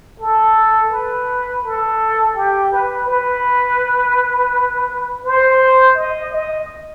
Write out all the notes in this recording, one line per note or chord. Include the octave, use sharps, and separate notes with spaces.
A4
B4
A4
G4
B4
B4
C5
D#5
D#5